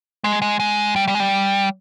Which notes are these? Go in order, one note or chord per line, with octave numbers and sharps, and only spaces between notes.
G#3
G#3
G#3
G3
G3
G#3
G3